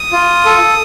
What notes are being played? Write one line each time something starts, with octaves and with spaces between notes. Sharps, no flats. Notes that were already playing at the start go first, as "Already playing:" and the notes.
Already playing: D#6
F4
A4